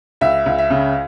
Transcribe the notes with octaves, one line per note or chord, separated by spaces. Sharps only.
C#2 E5
C#2
E5
C#3